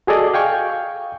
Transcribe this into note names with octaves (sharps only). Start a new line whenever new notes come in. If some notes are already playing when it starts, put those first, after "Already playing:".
F#4 G#4 A4 D5 D#5
F5 G5 G#5 C#6